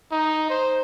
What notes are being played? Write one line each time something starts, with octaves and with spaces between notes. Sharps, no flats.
D#4
C5